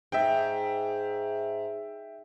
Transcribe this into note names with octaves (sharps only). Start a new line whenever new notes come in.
G#2 E5 G5